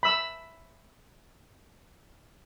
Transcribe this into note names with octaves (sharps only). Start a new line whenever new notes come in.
B5 E6